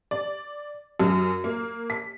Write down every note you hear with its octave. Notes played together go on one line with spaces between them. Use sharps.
D5
F#2
A#3
B6